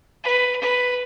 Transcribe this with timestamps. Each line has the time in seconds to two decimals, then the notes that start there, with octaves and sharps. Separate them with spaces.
0.24 B4
0.61 B4